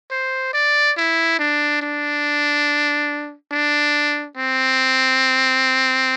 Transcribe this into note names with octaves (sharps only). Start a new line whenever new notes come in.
C5
D5
E4
D4
D4
D4
C4